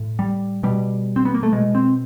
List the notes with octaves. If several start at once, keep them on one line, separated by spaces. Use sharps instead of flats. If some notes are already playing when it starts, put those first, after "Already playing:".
Already playing: A2
G3
B2 G3
C4
B3
A#3
A3
B2 G#3
C4